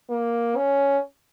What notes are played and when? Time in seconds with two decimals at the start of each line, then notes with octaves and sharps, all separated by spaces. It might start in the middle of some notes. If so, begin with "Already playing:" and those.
0.10 A#3
0.57 C#4